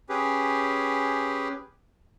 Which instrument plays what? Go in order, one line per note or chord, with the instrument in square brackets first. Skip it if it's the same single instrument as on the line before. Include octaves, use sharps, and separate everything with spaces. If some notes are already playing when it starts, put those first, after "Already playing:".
[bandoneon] C#4 G4 G#4 B4